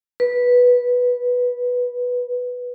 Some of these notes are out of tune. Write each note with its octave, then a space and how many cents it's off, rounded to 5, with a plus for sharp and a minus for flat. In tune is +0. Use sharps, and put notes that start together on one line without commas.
B4 -10